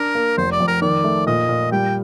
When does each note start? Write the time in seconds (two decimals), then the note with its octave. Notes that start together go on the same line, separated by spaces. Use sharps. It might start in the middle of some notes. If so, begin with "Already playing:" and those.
Already playing: D4 A#4
0.15 A#3
0.37 F1 C5
0.52 D5
0.60 F2
0.67 A#4
0.82 D#3 D5
1.04 A3
1.27 A#2 D#5
1.49 A#2
1.72 G3 G5